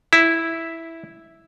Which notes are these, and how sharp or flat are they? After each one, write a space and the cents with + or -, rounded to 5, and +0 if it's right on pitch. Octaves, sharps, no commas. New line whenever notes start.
E4 -5